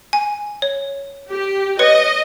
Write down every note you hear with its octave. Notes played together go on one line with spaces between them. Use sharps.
G#5
C#5
G4
B4 C#5 D#5 C#7